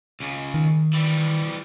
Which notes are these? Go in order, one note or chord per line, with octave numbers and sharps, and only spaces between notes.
C#2 C#3
D#3
E3 G3